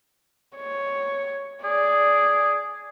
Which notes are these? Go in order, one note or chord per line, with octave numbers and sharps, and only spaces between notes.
C#5
G#4 D5